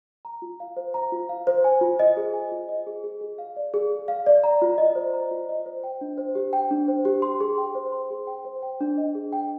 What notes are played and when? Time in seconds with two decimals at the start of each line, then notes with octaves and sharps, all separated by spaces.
0.25 A#5
0.42 F4
0.60 F5
0.77 C5
0.94 A#5
1.12 F4
1.29 F5
1.47 C5
1.64 G#5
1.81 F4
1.99 D#5
2.17 G#4
2.34 G#5
2.52 F4
2.69 D#5
2.87 G#4
3.04 G#4
3.21 G#4
3.38 F5
3.56 D5
3.74 G#4
3.92 G#4
4.08 F5
4.26 D5
4.44 A#5
4.62 F4
4.78 D#5
4.95 C5
5.13 A#5
5.31 F4
5.49 D#5
5.66 C5
5.84 G5
6.01 D4
6.18 C5
6.35 G4
6.53 G5
6.71 D4
6.88 C5
7.05 G4
7.22 C6
7.41 G#4
7.58 G5
7.75 C5
7.92 C6
8.10 G#4
8.27 G5
8.45 C5
8.63 G5
8.81 D4
8.98 D#5
9.15 G#4
9.33 G5